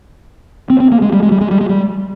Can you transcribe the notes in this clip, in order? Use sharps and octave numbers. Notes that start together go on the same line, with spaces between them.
C4
C4
A#3
G#3
G3
G#3
G3
G#3
G3
G#3
G3